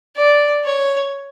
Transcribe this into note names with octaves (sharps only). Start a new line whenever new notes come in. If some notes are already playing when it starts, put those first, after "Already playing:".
D5
C#5